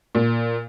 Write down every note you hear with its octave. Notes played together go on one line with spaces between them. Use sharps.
A#2